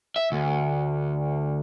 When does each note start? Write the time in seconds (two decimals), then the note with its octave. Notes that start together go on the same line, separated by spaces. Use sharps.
0.16 E5
0.32 D2